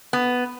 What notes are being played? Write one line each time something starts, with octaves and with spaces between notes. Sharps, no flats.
B3